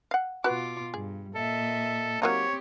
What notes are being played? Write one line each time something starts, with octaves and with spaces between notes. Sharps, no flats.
F5 F#5
B2 F4 F#4 B4 D6
G2 G#4
A#2 A4 D#5 E5
F#3 A#3 C4 D#4 G4 C#5